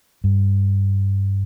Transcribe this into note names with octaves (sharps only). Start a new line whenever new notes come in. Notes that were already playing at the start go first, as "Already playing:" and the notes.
G2